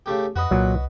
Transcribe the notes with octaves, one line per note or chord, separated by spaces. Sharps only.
C#3 A3 G4
F2 F#4 B4 D#5
C2 A#2 F#3